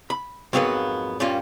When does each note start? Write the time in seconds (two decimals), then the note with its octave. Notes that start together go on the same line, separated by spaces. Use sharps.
0.10 B5
0.53 F2 G#2 F#3 A#3 B3 B4
1.20 G2 A#2 G3 A#3 C#4 F4